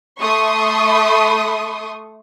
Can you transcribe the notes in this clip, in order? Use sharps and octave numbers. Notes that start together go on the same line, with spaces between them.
A3 C6 C#6 D#6